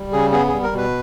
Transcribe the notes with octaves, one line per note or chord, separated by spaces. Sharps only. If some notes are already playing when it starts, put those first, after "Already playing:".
Already playing: G3
C#3 G#4
B3 G#4
G#4
G3
A#4
B2 B4